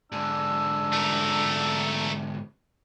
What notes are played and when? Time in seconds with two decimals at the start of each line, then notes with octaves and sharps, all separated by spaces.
0.12 G#2 D3 D4 E6
0.93 A3 A#4